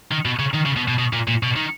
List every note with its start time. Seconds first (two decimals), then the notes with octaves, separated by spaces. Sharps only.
0.11 D#3
0.25 B2
0.39 C#3
0.54 D#3
0.66 C#3
0.77 B2
0.88 B2
0.99 B2
1.13 A#2
1.28 A#2
1.43 B2
1.56 D#3